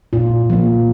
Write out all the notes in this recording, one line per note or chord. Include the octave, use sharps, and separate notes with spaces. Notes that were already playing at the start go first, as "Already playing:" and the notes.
A#2 F4
F3 A#3